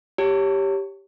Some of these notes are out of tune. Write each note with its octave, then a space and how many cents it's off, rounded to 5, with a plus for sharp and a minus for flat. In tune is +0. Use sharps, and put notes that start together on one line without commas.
G4 +0 C#5 +0 A5 +35